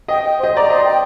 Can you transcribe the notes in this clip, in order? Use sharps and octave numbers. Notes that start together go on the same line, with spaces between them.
D#5 G5
G5
C5
D#5
D5 A#5
C5 D#5
G5